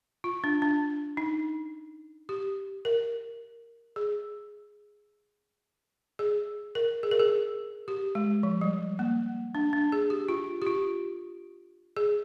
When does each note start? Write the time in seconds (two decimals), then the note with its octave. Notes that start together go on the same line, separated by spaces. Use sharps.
0.24 F4
0.44 D4
0.62 D4
1.17 D#4
2.29 G4
2.85 A#4
3.96 G#4
6.19 G#4
6.75 A#4
7.03 G#4
7.11 A#4
7.20 G#4
7.88 G4
8.15 G#3
8.43 F3
8.61 G3
8.99 A#3
9.55 D4
9.73 D4
9.92 G#4
10.10 G4
10.29 F4
10.62 G4
10.66 F4
11.97 G#4